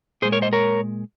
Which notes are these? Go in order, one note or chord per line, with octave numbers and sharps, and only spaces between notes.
A#2 G#3 G#4 C5
A#4 C#5
C5 D#5
A#4 C#5